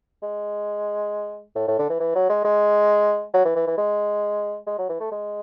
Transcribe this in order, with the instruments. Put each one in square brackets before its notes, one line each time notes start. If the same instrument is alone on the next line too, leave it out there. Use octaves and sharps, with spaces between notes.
[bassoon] G#3
A2
A2
D3
E3
E3
F#3
G#3
G#3
F#3
E3
E3
E3
G#3
G#3
F#3
E3
A3
G#3